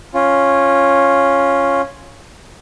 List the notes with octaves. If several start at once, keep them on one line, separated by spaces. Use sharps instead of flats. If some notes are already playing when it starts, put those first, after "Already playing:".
C#4 F4